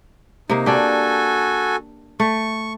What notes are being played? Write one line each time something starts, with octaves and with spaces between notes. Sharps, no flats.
C3 A#3 D#4
D4 F#4 G4 A4 G#5
A3 C#6